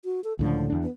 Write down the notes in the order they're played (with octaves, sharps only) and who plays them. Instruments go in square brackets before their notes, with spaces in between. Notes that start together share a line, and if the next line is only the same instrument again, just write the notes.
[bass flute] F#4
A4
[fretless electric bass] C#2 A2 F3 [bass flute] D3
[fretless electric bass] E2 D4
[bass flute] B3